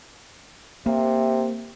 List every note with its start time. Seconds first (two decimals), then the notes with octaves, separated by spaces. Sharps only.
0.86 C3 A#3